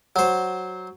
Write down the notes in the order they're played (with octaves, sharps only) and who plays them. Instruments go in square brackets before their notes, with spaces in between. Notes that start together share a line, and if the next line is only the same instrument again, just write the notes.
[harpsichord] F#3 C5